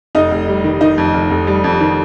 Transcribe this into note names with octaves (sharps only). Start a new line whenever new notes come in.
F1 D#4 D#5
F1
G3
D#3
D#3 D#4 D#5
F2
F1
F1
G3
F2
D#3